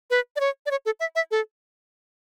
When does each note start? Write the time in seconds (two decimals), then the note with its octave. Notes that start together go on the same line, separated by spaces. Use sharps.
0.10 B4
0.36 D5
0.40 C#5
0.66 D5
0.71 C#5
0.86 A4
1.00 E5
1.15 E5
1.31 A4